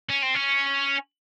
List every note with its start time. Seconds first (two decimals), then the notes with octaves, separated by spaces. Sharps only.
0.09 C#4
0.22 C4
0.34 C#4